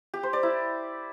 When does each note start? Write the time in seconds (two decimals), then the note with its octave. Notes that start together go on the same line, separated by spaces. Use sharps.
0.14 G4
0.23 C5
0.33 D5
0.43 E4